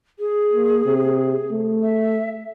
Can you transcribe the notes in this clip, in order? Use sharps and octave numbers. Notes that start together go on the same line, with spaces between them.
G#4
A#3
C3
A3
E5